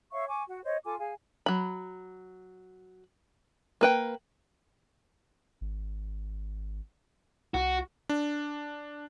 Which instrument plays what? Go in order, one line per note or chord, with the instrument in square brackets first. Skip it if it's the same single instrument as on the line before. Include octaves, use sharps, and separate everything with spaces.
[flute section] C#5 E5 F5 C#6
G#5 C#6 D6
F#4 F#5
C5 C#5 D#5
F4 A4 G#5 D6
G#4 F5 G#5
[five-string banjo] F#3 B5
A#3 B4 G5
[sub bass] G#1
[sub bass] C2 [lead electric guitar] F#4
[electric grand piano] D4